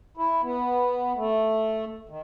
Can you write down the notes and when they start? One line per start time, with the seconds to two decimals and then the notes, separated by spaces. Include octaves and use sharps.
0.17 E4
0.43 B3
1.16 A3
2.09 D#3